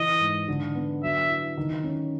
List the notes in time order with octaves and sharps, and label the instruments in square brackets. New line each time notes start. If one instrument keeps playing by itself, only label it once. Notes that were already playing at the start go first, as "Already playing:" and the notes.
Already playing: [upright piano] E3 [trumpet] D#5
[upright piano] G#2
D3
B3
[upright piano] F#3 [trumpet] E5
[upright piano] E4
D#3
C#4